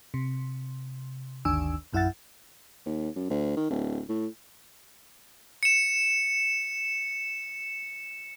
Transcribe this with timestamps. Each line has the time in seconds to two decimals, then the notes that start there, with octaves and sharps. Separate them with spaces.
0.14 C3
1.45 G1 D2 D#3 D4 G#5 E6
1.93 A#1 F#2 E4 E5 F#5 A6
2.86 D#2
3.16 F#2
3.30 D2
3.56 D#3
3.70 D1
4.09 A2
5.63 C#7 E7